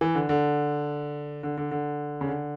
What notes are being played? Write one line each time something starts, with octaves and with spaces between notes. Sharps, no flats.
E3
D3
D3
D3
D3
D3
C#3
D3